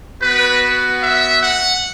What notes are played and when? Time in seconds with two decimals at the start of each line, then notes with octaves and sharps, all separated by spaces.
0.20 B3 F#4 B4
1.00 E5
1.39 F#5